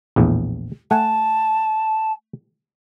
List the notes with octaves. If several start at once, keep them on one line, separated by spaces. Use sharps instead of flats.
A#1 E2 A2
A3 F#5 G#5 A5